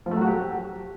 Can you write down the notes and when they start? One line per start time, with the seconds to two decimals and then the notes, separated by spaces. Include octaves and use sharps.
0.06 F3
0.11 A3
0.16 F#3
0.22 F#4
0.27 G4